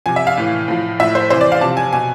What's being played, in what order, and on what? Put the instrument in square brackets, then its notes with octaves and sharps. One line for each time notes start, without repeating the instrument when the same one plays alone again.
[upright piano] C3 F3 G#5
E5
F5
A2 E3
A2 F3
A2 F3 E5
C5
C3 E3 C5
D5
F5
C3 F3 A5
G#5
B2 G#5